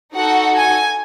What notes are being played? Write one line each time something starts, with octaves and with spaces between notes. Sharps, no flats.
D#4 F#4 A4 F#5
G#5